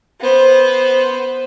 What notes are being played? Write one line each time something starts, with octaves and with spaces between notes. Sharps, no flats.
B3 C5